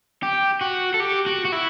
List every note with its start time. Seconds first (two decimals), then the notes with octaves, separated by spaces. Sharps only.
0.23 G4
0.61 F#4
0.94 A4
1.00 G4
1.26 F#4
1.45 F#4
1.52 E4